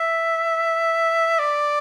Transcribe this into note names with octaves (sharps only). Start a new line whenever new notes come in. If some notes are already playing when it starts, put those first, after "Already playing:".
Already playing: E5
D5